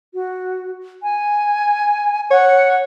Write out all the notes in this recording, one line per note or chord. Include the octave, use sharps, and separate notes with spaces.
F#4
G#5
C#5 F#5